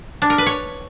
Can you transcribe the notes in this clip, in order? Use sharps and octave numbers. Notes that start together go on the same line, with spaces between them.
D4
A#4
B4
C#5